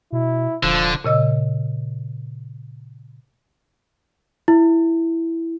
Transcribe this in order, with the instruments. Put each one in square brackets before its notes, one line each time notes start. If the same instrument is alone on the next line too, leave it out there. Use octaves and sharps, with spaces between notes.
[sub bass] B2 [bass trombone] E4
[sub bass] D#1 [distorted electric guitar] D3 [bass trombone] F3
[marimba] A#2 C#3 D#5 E6
[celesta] E4